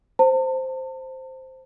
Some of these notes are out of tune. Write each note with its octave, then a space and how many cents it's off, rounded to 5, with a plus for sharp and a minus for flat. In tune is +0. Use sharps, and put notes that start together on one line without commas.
C5 +0 A5 +40